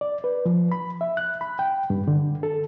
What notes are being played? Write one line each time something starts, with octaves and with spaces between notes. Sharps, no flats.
D5
B4
F3
B5
E5
F#6
B5
G5
G2
D3
A4